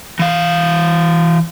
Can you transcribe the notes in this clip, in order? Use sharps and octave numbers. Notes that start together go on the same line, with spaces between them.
E3 F5